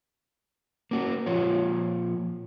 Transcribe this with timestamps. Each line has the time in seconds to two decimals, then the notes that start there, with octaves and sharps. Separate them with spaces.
0.91 A#3 C#4 F#4
1.26 A#2 F3 F4 C#5